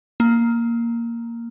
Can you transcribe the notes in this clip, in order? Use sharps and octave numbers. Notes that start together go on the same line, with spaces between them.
A#3